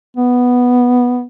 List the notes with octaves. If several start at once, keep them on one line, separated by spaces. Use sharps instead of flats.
B3